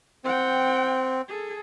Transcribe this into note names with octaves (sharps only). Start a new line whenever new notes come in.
C4 F#5 G5
G#4 A4